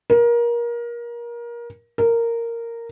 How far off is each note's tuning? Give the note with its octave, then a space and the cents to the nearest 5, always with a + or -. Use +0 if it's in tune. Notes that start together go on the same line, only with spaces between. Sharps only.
A#4 +25
A#4 -10